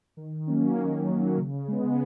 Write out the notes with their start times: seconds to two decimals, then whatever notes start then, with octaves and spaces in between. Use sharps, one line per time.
0.17 D#3
0.47 F#3 A#3 C#4
0.77 D#3
1.08 F#3 A#3 C#4
1.38 C#3
1.68 G#3 B3